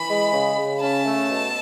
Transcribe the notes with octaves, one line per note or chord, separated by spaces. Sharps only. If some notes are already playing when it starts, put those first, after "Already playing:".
Already playing: E3 B5
G#3
C#3
C#3
C#4 A5
A3
B2